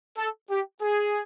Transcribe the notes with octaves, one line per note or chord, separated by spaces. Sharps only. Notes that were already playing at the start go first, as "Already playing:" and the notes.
A4
G4
G#4